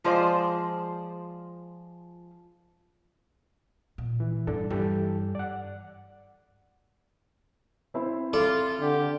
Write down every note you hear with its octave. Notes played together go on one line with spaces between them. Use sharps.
F3 G#3 F4 C5 D5
A#2
E3
G2 D4 A4
G2 E3 G4 A4
D5 F#5
C4 E4 C5
F4 A4 D5
D3 G4